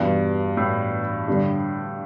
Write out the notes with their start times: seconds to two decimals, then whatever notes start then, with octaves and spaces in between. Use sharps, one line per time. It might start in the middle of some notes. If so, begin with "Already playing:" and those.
Already playing: E2 G2 B2 B3 G4 B4
0.57 A2
1.28 G2 D3 G3